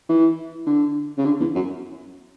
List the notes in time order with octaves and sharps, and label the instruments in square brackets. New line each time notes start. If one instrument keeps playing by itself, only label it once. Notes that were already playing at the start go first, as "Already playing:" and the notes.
[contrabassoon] E3
D3
C#3
D3
E2
F#2